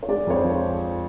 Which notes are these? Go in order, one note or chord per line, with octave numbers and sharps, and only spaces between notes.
C#5
G#3 D5
F2 C#5
C5
F3
C5